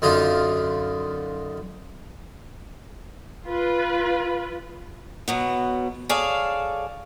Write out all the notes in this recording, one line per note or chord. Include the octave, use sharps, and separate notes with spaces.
F#2 D3 D#4 F4
F4 B4
B2 F#3 B3
G#4 A4 C#5 D5 F5 A5